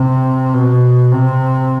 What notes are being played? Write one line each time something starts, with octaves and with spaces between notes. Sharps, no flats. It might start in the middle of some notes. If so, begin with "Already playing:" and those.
Already playing: C3
B2
C3